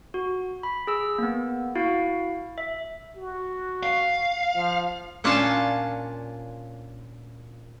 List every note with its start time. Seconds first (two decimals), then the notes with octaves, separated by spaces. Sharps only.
0.14 F#4
0.63 B5
0.87 G#4 E6
1.18 A#3 B3
1.75 E4 F#4 F5
2.58 E5
3.16 F#4
3.83 F5
4.55 F3
5.24 A#2 C#4 D4 F4 G#5 A5